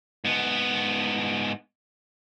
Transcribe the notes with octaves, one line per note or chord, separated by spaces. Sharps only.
G#2 B3